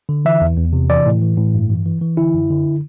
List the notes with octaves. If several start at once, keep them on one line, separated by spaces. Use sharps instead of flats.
D3
E3 E5
E2
E2
C3
E3 D5
A2
E3
A2
G2
E3
E3
E3
D3 E4
F#2
D3